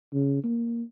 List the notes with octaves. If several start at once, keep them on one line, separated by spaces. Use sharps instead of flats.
C#3
A#3